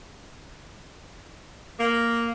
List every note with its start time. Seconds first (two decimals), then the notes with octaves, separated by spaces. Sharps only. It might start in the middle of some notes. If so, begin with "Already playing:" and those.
1.79 A#3